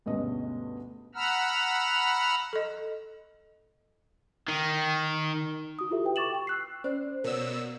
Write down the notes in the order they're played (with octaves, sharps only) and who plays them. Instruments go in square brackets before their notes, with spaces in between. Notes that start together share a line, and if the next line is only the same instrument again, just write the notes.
[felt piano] D2 G2 B2 G#3 C#4 D#5
[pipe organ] F#5 A#5 B5 E6 F6
[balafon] A4 D#5
[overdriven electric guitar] D#3
[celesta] F#4 D#6
E4 F4 G4 A4 E5
G4 B4 G5
C#6 D6 A6 E7 F#7
G5 C#6
E6 F#6 C7
[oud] C4 [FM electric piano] C#4 D5 [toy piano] C5
[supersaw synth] B2 E6 [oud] F#3 A#3 [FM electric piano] A#4 C#5 D5